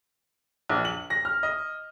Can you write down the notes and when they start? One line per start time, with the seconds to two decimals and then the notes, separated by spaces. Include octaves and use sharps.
0.69 A#1
0.85 F#7
1.10 A#6
1.25 F6
1.43 D#5